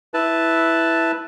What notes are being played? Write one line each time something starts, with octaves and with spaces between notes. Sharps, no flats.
E4 B4 A5